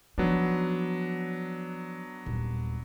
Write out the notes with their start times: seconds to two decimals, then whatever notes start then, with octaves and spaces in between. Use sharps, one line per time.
0.18 F3 F#3 B3 D4 D#4
2.26 D#1